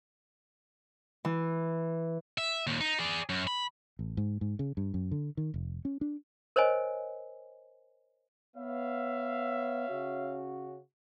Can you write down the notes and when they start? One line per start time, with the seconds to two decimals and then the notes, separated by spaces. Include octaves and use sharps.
1.25 E3
2.38 E5
2.67 D#2 A#2
2.81 D#4
3.00 G#4 D5
3.29 F#2
3.47 B5
3.99 A1
4.17 G#2
4.41 G#2
4.59 C#3
4.77 G2
4.94 F#2
5.11 D3
5.37 D#3
5.54 F1
5.85 C#4
6.01 D4
6.56 A#4 C5 C#5 D#5 G#5
8.56 B3 C#5 E5 F5
9.88 C#3 C#4 F#4